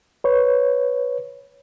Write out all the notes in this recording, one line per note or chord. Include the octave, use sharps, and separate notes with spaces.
B4 C#5